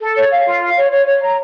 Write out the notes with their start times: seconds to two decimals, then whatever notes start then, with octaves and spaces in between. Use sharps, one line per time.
0.01 A4
0.17 C#5
0.31 F5
0.46 F4
0.62 F5
0.76 C#5
0.91 C#5
1.06 C#5
1.22 A#5